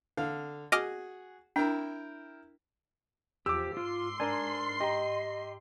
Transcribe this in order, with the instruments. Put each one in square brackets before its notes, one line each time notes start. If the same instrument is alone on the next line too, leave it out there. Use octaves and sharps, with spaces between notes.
[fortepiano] D3 F5
[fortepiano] F#4 G#4 [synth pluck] D#5 D6 F6
[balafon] D4 [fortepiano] E4 A#4 G5
[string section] E2 F3 [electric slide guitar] G4 [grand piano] D6 E6
[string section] G#2 C6 C7 [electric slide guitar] F4
[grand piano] D4 A#4 [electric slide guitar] G#5
[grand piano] G4 A#5 [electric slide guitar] D#5